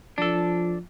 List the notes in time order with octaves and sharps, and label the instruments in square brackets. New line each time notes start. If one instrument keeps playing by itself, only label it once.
[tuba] F3 [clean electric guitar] D4 A4